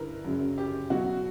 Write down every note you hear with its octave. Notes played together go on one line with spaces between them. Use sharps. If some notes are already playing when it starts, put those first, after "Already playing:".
Already playing: G2 D3 G3 E4 A#4 B4
F#2 C#3 F#3
G4
B2 F#3 F#4